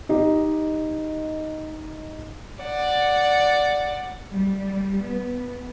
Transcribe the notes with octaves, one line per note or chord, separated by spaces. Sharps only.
D#4 G4 D#5
D5 F#5
G3
B3